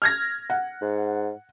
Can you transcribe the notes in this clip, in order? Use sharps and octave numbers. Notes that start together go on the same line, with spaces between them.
F6 G#6 A#6
F#5
G#2